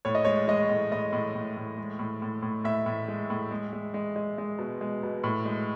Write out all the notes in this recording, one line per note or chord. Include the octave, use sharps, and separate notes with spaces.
A2 C#5
D#5
G#3 C#5
G#3 D#5
A2
A2 D#5
A2
A2
A2
G#3
A2
A2
A2
A2 E5
A2
G#3
A2
G#3
G#3
G#3
G#3
G#3
B2
G#3
B2
A2
G#3